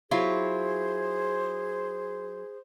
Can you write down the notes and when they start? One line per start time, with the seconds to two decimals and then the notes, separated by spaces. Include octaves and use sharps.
0.11 F#3 E4 F4 G#4 C5